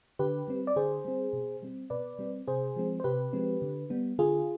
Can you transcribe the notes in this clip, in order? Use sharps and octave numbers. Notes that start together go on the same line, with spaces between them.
D3 G4 B4
G3 C4
D5
D3 G#4 C5
G3 C4
B2
G3 C4
B2 B4 D5
G3 C4
C3 G#4 C5
F3 G#3 C4
C5
C3 G4 B4
F3 G#3 C4
D3
G3 B3
D3 F4 G#4